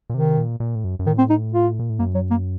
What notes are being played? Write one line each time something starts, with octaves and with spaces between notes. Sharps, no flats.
A#2
C3 D#3
A#2
A#2
A2
F#2
F#2
A2 D#3
C4
D#4
F4
A#2
A2
F#2 A#3
F#3
A#3